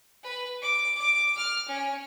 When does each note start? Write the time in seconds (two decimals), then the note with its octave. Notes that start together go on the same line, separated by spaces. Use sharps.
0.24 B4
0.62 D6
0.97 D6
1.37 F6
1.68 C#4